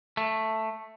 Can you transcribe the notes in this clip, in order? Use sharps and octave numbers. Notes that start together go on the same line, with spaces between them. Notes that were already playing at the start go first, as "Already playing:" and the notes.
A3